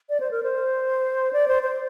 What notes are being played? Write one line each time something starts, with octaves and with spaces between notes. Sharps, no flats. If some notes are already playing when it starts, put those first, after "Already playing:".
D5
C5
A#4
C5
D5
C5
C5